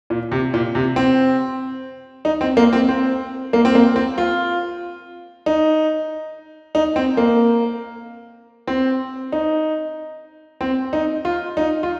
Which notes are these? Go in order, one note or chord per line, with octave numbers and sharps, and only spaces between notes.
A#2
C3
A#2
C3
C4
D#4
C4
A#3
C4
C4
A#3
C4
A#3
C4
F4
D#4
D#4
C4
A#3
C4
D#4
C4
D#4
F4
D#4
F4